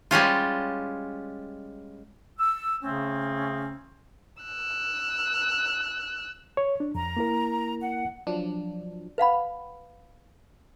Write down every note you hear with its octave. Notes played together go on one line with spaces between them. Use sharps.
G3 G#3 C#4 F4
E6
C#3 A3 C4 C#4
E6 F#6
C#5
D4
F2 A#5
A#3 E4 A#4
F#5
F3 F#3 D4
B4 F5 F#5 B5